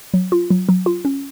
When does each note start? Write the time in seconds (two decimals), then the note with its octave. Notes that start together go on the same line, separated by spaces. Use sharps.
0.14 F#3
0.32 F4
0.50 F#3
0.69 F#3
0.86 F4
1.05 C#4